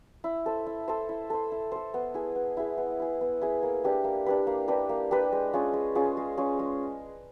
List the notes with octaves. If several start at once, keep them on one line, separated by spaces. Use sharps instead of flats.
E4
A4 C5
E4
A4 C5
E4
A4 C5
E4
A4 C5
B3
E4 G#4
B3
E4 G#4
B3
E4 G#4
B3
E4 G#4
A#3
D4 G4 B4
A#3
D4 G4 B4
A#3
D4 G4 B4
A#3
D4 G4 B4
G#3
C#4 F4 G#4
G#3
C#4 F4 G#4
G#3
C#4 F4 G#4
G#3